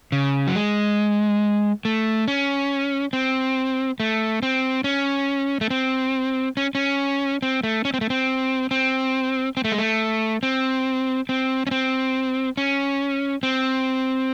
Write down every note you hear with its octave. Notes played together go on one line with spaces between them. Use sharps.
C#3
F#3
G#3
A3
C#4
C4
A3
C4
C#4
A3
C4
C#4
C#4
C4
A3
C#4
C4
A3
C4
C4
C4
A3
G#3
A3
C4
C4
C#4
C4
C#4
C4